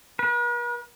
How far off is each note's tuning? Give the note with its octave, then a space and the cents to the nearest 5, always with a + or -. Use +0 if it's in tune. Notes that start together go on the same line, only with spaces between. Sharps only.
B4 -45